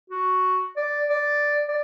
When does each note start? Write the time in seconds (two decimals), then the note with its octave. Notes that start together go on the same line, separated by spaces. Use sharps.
0.10 F#4
0.77 D5
1.09 D5
1.68 D5